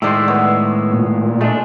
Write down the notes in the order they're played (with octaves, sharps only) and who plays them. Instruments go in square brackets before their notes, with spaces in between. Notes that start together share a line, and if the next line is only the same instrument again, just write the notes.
[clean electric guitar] A2 D#3 G#3 [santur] C5 D5 E5
[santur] B3 C#5
[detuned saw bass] A#2
[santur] G#3 [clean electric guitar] A3 D4